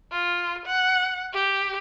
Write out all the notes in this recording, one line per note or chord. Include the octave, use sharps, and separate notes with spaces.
F4
F#5
G4